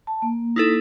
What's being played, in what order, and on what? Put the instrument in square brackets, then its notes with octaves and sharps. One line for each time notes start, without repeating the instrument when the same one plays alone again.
[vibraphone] A5
A#3
[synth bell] D#4 E4 A4